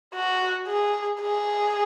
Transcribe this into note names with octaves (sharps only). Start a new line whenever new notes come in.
F#4
G#4
G#4